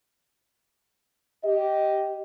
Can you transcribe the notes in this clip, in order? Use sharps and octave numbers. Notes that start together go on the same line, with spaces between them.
G4 D#5